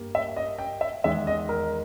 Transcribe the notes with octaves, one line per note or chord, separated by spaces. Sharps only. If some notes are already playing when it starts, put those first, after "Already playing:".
Already playing: G2 G3 A#3
E5
D#5
G5
E5
E2 D#3 G#3 E5
D#5
A#4